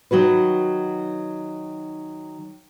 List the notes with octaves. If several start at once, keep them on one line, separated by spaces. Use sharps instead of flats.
D#3 F#3 F#4 B4